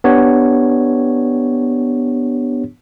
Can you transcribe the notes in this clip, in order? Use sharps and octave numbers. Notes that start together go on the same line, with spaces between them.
B3 D4 G4 C#5